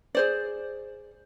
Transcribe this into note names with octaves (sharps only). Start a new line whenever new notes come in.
G#4 C5 D5